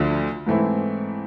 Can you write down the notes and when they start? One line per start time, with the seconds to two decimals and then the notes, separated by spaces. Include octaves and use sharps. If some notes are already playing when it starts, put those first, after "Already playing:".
Already playing: D2 D3 F3
0.47 G#2 E3 A3 C4 E4